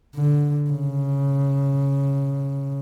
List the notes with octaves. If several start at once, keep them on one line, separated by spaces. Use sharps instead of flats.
D3
C#3